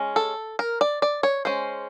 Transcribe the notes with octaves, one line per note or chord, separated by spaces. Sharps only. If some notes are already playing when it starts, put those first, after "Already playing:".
Already playing: G#3 C#4
A4
A#4
D5
D5
C#5
G#3 C#4 C5